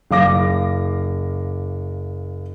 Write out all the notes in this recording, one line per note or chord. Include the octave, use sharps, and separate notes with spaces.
F#1 F5 D6 A#6